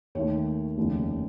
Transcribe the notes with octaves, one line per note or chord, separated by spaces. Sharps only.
D#2 D#3 A3 C#5
F1 D#2 C#3